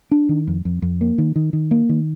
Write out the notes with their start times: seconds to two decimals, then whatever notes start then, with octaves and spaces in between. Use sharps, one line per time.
0.11 D4
0.29 D#3
0.47 F2
0.65 F2
0.82 F2
1.01 A#3
1.18 D#3
1.36 D#3
1.53 D#3
1.71 A#3
1.89 D#3